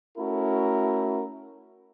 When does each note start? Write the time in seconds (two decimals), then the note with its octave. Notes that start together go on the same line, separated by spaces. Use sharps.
0.18 A3 C#4 E4 F#4 A4 A#4